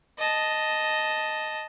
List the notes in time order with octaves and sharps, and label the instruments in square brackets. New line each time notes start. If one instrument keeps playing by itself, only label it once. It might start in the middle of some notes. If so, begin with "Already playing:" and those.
[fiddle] D#5 A5